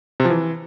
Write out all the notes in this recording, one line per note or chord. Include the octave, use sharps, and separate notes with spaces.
C3
F3
E3